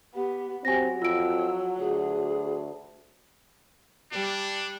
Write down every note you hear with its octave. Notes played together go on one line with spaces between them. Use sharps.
B3 G4
F#3 C4 G4 G#5 A#6
F2 F4 E6 D7
D2 G#4
G3 D4